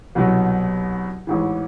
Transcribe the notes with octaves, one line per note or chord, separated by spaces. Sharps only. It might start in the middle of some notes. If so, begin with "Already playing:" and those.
C2 B2 F#3
A1 G#2 E3